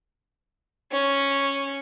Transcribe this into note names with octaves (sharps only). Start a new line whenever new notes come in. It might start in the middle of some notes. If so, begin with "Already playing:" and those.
C#4